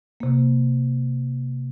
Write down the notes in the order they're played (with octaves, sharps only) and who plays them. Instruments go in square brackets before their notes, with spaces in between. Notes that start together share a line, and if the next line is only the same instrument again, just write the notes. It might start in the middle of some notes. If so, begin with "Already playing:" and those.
[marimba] C3 A#3